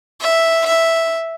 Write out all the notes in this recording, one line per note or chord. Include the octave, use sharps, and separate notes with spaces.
E5
E5